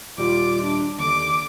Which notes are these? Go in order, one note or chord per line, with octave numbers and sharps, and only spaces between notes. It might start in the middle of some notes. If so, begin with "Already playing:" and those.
D#1 G3 F4 D6
D4
D#2 D3 D6